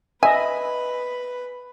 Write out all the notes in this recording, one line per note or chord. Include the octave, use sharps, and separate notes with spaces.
B4 D#5 E5 G#5 B5